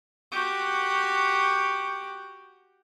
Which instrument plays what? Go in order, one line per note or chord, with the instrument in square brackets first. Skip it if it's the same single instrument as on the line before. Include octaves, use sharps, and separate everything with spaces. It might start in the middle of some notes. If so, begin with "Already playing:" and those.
[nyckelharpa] F#4 G4